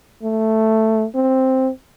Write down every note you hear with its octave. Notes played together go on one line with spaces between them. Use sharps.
A3
C4